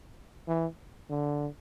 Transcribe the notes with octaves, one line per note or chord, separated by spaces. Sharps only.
E3
D3